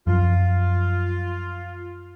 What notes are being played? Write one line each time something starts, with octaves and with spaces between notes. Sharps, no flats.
F#2 F3 F4